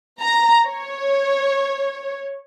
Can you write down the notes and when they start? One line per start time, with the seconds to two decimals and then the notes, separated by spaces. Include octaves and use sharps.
0.20 A#5
0.67 C#5